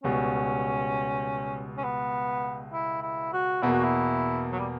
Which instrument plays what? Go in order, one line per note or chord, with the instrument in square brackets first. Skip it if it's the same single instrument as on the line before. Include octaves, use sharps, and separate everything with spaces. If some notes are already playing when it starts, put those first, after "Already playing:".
[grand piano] C#2 B2 G3 [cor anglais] C#4
[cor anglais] C#4
B3
E4
E4
F#4
[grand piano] E2 B2 A#3 [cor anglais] E4
[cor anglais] F#4
E4
F#3
G3